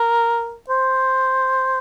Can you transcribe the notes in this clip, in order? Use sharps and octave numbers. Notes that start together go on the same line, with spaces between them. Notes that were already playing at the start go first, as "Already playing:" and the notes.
Already playing: A#4
C5